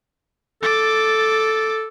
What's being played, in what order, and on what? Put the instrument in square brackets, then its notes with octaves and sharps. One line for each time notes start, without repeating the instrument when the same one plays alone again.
[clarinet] A4 [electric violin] D6 A6